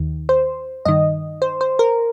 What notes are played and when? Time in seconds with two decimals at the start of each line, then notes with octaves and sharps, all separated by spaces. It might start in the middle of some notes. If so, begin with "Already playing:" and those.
Already playing: D#2 D#3
0.29 C5
0.85 G2 D#3 D#5
1.42 C5
1.61 C5
1.79 A#4